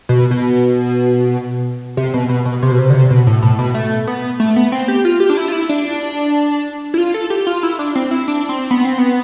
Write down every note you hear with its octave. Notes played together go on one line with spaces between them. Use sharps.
B2
B2
C3
B2
B2
B2
C3
B2
C3
D3
C3
B2
A2
A2
B2
A3
B3
A3
B3
C4
G4
F4
G4
D4
E4
F4
E4
D4
E4
F4
A4
G4
F4
E4
D4
C4
E4
D4
C4
B3
C4
B3